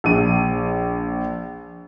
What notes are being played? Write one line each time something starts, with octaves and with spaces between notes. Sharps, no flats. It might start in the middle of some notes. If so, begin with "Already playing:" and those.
A#1 D#7